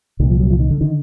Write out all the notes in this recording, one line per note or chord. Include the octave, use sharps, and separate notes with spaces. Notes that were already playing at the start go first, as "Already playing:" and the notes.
C2 A#2 D#3
F3
F#3
F3
D#3
D3
D3 D#3